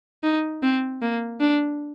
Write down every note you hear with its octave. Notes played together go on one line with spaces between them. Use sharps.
D#4
C4
A#3
D4